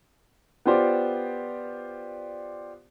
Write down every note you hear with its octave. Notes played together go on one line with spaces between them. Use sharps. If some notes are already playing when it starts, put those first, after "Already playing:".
B3 F4 G4 C5 D5